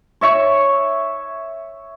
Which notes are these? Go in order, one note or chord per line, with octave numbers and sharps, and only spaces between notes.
C#5 E5 C#6